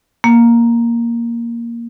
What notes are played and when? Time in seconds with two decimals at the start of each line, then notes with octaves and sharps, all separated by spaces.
0.24 A#3